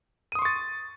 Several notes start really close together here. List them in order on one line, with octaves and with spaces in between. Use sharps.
D#7 D#6 C6 C#6 A6